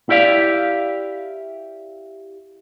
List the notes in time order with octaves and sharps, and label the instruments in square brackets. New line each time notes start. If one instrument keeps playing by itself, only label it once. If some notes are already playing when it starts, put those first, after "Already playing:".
[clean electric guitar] E4 G4 D5 F5